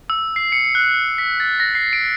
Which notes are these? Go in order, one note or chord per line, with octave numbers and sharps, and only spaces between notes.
E6
C7
C#7
F#6
B6
A6
A#6
C7
D7